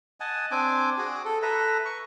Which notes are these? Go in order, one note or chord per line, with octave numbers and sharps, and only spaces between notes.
D#5 F#5 G#5 A5
C4 D4 G#5 D6
F#4 G#4
A4
A4 B4 E5 A#5
C#6